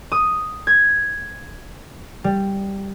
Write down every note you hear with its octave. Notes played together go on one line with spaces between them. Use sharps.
D#6
G#6
G3